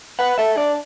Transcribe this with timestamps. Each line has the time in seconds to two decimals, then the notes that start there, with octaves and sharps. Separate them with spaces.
0.19 B4 F#5
0.38 A4 E5
0.57 D4 D5